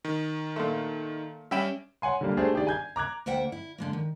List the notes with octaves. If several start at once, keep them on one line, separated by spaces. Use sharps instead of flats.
D#3
A#2 A3
G3 C#4 E5 G5 B5 E7
C#5 F#5 G#5 C6
D3 G3 A#3
A3 D4 G4 G#4 C5
D#3 G4 G#4 D5
G#5 G6 G#6
A#5 D6 F#6 G#6
D2 A#3 C5 E5 F#5 G5
E4
D3 G#3 A#3
D#3